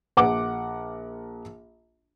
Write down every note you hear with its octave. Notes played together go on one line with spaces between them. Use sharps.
A#1 F#5 D6